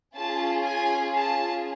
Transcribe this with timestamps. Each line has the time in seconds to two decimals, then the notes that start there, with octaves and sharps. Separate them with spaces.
0.16 C#4 F4 G#4 A5
0.66 G#5
1.16 A5